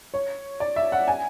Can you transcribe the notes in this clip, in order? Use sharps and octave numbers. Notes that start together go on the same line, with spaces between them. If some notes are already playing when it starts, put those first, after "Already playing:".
C#5
D5
E5
F#5
G#5